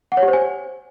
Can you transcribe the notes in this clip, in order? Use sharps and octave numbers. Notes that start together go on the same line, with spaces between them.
F#5
C#5
G4
C5
G#5